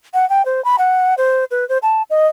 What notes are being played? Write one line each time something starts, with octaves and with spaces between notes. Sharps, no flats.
F#5
G5
C5
B5
F#5
C5
B4
C5
A5
D#5